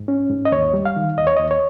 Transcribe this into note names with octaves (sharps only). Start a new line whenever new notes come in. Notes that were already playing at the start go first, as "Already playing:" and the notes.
Already playing: G#2
C#4
G#2
D#5
D#2 C#5
G3
F5
D#3
D#2 D#5
C#5
D#2 D#5
C#5